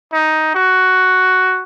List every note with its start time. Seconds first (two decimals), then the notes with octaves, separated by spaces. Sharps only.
0.12 D#4
0.55 F#4